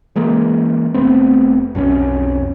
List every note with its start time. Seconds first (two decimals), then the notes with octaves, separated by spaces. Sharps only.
0.16 C#3 E3 G#3 A#3
0.94 F1 A3 B3 C4
1.75 B1 F2 D#3 C#4